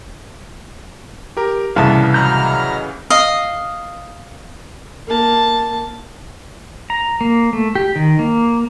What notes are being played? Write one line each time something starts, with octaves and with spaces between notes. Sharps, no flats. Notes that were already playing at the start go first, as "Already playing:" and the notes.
G4 A#4
C2 A2 C#3 E3 B3 F5 A5
F#3 D#5 A#5 B5 F6 G6
D#5 F5
A#3 A5
A#5
A#3
A3
G4
D#3
A#3